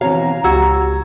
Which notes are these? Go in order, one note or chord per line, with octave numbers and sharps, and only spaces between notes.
B2 E3 C4 F#4 C#5 F5 A#5
C#2 F#4 G4 E6 G#6